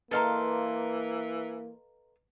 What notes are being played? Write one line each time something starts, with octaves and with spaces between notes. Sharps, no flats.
E3 A#3 A4 B4 D#5 F5 A#5 C6